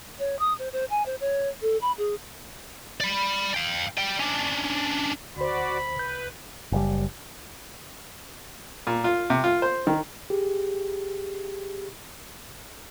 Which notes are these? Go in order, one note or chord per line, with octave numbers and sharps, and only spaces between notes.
C#5
D#6
C5
C5
G#5
C5
C#5
A4
B5
G#4
D5 B5
F5 G5
G3 G5
C#4 D4
D2 F#4 C5 D5 B5
C2 B4 G6
F#1 A2 G3
A#2
F4
C3
F4
C5
D#3
G4 G#4